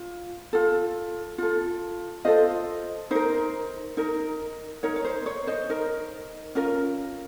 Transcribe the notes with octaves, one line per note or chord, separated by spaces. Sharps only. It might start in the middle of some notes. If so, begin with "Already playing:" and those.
Already playing: F4
F4 A4
F4 A4
F4 A4 C5 D#5
D#4 A#4 C5
D#4 A#4
D#4 A#4 C#5
C#5
C5
C#5
C5 D#5
D#4 A#4
C#4 F4 A#4